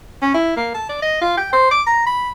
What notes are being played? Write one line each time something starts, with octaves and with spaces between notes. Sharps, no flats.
C#4
E4
A#3
A5
D5
D#5
F4
G5
C5
D6
A#5
B5